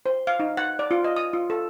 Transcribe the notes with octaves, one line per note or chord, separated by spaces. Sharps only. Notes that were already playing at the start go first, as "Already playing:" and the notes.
C5
F5
D#4
F#5
D5
F4
D#5
D#6
F4
A4